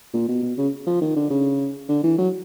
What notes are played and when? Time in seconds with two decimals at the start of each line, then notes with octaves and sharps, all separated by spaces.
0.14 A#2
0.29 B2
0.43 B2
0.58 C#3
0.87 F3
1.01 D#3
1.16 D3
1.30 C#3
1.89 D3
2.03 E3
2.18 F#3